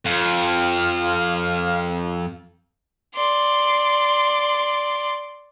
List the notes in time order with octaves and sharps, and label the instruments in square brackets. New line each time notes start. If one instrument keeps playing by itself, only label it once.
[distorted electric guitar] F2 [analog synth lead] F5
[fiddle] D5 C6